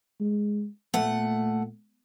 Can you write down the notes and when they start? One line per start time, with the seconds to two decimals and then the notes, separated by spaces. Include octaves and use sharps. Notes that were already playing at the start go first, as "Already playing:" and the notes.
0.20 G#3
0.94 A#2 A3 F#5